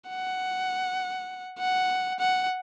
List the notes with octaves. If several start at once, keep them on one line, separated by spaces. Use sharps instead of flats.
F#5
F#5
F#5